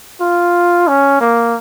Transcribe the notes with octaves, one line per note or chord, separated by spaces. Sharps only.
F4
C#4
A#3